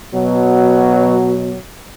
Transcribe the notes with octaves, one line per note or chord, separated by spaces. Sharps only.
B2 F#3